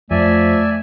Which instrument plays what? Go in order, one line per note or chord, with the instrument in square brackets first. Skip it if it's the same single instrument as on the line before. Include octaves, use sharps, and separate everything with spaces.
[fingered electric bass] F2 [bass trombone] F3 [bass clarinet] A3 [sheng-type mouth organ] D5 E5 G#5